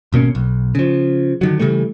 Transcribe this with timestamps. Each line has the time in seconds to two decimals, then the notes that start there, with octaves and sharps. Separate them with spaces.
0.12 G#1 B2 A#3 C#4
0.35 B1
0.75 C#3 F3
1.41 D3 D#3 F#3
1.59 C#3 E3 G3 A3